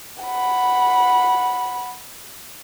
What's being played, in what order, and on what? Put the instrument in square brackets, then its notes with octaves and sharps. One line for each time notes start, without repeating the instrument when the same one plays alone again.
[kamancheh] F#5 B5